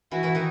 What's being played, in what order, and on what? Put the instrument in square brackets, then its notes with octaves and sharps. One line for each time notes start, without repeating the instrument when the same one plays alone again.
[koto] E3 E4 [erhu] F#4
[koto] E3 E4
D#3 D#4